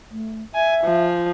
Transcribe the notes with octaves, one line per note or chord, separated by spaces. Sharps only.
A3
E5 G#5
F3